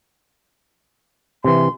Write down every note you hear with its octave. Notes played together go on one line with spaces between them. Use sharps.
C3 E3 C6